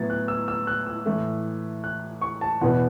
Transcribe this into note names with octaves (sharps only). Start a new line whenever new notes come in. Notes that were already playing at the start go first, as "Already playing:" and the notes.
Already playing: A2 F#3 B3 A6
F#6
E6
E6
F#6
E6
A2 E3 A3
F#6
C#6
A5
E2 B2 B3 F#5